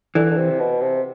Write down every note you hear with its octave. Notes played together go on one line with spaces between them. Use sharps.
D3 E3
D3
C3
B2
C3